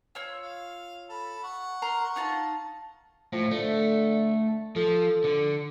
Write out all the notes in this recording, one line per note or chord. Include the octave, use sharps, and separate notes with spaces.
F4 C#5 E6
F5
A4 B5
F#5 C#6
A#4 A#5 C6
D#4 F4 A5
A2 F3
D3 A3
F3 A4
D3